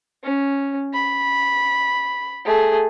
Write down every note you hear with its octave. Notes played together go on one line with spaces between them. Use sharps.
C#4
B5
A3 G#4